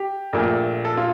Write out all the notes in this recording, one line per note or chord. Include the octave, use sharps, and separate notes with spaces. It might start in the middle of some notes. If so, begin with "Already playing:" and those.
Already playing: G4
A#1 A#2 A3
A4
F4